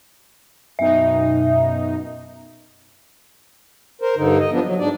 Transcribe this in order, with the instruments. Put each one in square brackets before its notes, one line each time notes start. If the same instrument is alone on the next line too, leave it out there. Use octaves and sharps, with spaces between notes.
[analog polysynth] F#2 B2 D#4 [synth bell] E5
[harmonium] A#4 C5
G2 D3 D#4
D#5
F3 B3 D4
F#3
G#2 D4 D5